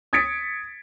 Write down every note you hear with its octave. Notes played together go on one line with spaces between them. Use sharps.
D#6 G#6 A6 B6 C#7 D7